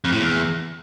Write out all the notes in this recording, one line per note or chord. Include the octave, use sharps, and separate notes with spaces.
F2
A2
E2